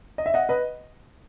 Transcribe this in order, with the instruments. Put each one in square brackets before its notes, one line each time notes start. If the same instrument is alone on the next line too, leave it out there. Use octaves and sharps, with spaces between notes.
[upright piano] D#5
E5
D#5 F#5
B4 D#5